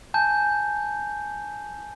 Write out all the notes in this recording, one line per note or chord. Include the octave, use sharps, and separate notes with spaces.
G#5 A5 G6